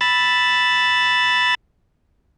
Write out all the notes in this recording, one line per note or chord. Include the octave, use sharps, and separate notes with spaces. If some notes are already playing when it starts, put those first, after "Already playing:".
B5 E6 A6